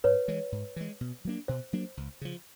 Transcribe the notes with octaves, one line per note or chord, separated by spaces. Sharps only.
G#2 B4 C#5
E3 G#3
G#2
E3 G#3
B2
F#3 A#3 D4
B2 C5
F#3 A#3 D4
C#2
C#3 F3